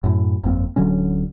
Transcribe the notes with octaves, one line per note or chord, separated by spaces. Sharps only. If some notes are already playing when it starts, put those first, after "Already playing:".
F#2 A2
G1 F2 A#3 C4
D1 D3 F#3 C#4